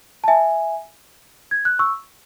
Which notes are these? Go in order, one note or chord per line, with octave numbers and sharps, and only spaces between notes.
A5
E5 G#5
G#6
F#6
C#6 E6